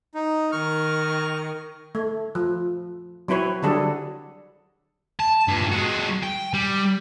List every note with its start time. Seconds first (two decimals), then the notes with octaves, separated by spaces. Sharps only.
0.15 D#4
0.52 D#3 C#6 F6
1.95 A3
2.35 F3
3.28 F#3 C4 E4 B4 C#5
3.63 D3 F#3 G3 D4 G#4 A4
5.20 A5
5.48 G2 A#2
5.71 G#3 F#4
6.23 G5
6.54 G3